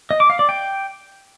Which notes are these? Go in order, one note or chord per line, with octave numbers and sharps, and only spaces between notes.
D#5
D6
F5
D5
G5